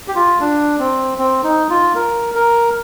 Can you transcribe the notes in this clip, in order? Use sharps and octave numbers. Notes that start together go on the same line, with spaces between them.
G4
F4
D4
C4
C4
D#4
F4
A#4
A#4